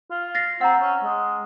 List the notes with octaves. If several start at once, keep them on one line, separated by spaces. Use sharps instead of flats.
F4
A6 A#6 C7
C4 F#5 A#5
C#4
G#3